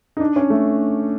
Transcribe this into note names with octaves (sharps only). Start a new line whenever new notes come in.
D#4
D4
C#4
A3